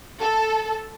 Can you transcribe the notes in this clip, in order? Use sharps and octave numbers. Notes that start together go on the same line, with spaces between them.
A4